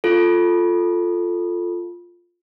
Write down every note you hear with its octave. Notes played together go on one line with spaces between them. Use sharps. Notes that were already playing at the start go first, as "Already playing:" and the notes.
F4 A4